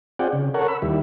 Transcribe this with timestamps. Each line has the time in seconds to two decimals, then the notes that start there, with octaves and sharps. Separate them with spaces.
0.19 C4 F4 G#4 D5 F#5 G5
0.33 C#3
0.54 A4 A#4 C#5 F#5
0.68 B5 E6
0.82 D#2 G3 E4